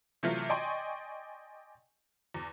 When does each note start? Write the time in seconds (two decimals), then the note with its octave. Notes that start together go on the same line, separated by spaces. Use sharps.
0.23 C3 E3 F#3 A3 F4
0.49 D5 D#5 G5 G#5 C6 C#6
2.34 E2